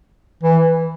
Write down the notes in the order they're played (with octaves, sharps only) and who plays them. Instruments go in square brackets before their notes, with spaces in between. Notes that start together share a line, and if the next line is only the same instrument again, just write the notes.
[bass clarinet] E3